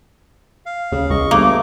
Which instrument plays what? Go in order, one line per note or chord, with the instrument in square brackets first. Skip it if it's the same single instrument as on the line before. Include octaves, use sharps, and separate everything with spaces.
[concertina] F5
[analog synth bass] D#2 [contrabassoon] C#3
[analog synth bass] C#2 [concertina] D#5 C#6
[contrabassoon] G1 [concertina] A3 D6 [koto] A#3